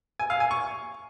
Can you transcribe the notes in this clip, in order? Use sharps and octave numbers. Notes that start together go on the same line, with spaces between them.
G#5
F5
G#5
C#6